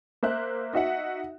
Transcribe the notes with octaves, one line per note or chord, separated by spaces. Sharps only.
A#3 C5 E5 F#6
D#4 F#4 E5 F#5